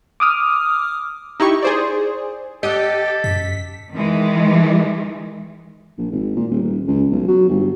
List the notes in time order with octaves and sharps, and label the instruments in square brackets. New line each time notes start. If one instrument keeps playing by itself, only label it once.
[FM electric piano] D6 D#6 F6
[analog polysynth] D#4 E4 G4 C#6
G#4 C5 D5
[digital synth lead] G4 [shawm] A4 [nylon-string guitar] D#5 F#5
[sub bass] F#2 [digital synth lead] B6
[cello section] D#3 E3 G#3
[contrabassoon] A#1
G#1
A#2
D#1
D#1
C#2
B1
F#3
G1